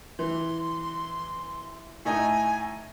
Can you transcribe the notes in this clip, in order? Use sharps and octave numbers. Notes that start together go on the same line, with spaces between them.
E3 C6
A2 A3 D#4 G#5